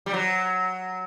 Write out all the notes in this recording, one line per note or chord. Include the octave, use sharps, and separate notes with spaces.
G3
F#3